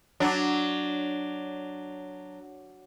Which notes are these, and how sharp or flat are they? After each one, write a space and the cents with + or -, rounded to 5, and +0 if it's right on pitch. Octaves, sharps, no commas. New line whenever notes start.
F#3 +0 D4 +0